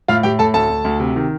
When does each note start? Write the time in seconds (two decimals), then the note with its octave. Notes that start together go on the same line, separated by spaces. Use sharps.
0.08 A2 F4 F5
0.23 A2 G4 G5
0.39 A2 A4 A5
0.54 D2 A4 A5
0.70 D2
0.84 D2
1.00 C3
1.16 D#3